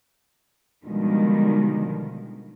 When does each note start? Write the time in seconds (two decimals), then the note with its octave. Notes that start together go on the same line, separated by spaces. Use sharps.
0.85 B2 D3 D#3 F3 G3 G#3